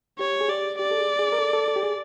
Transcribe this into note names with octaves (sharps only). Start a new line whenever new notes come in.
G4 C#5
G#4
G4 D5
G4 D5
A4
G#4
G#4
A#4
A4
A4
A4
G4
G#4